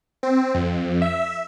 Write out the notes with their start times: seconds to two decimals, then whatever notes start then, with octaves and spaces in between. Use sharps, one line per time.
0.23 C4
0.55 F2
1.02 E5